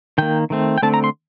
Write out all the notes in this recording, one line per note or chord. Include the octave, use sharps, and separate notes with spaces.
D#3 A#3 G5
D#3 A3 C4
G5
D3 A3 C4 A5
A#5
C6